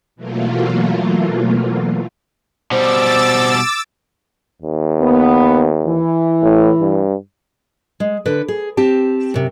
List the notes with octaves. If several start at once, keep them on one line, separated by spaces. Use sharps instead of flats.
B2 E3 F#3 A3 A#3 F4
B2 G3 C5 D6 E6 A6
D#2
B3
E3
A2
G2
G#3
D3 B4
G#4
C4 G4 A5
F#2 C3